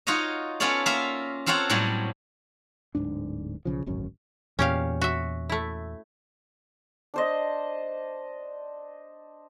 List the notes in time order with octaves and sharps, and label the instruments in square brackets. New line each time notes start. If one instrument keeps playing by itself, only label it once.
[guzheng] D#4 F4 F#4 C#5 D#5
B3 C#4 F4 A4 C#5 D5
A#3 F4 A#4 E5
C4 F4 A4 A#4 C#5 F#5
A2 F#3 G3 A#3
[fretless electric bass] D1 G#1 G#2 D4
B1 C#3 F3
D1 G#1 F#2 C#4
[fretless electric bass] E2 A#2 [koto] C#4 G4 F5
[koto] F#4 E5
A3 E4
[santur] D4 C5 D#5